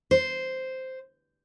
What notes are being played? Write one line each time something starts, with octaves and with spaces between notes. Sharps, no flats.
C5